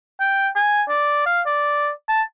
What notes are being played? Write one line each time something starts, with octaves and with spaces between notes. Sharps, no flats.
G5
G#5
D5
F5
D5
A5